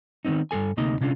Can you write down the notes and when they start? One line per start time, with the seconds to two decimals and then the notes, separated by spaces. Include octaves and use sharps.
0.25 D#3 F3 B3 C4 D#4
0.51 G2 A#2 A4 G#5
0.77 D2 C3 A#3 D#4 D#5
1.01 C3 C#4 D4 F4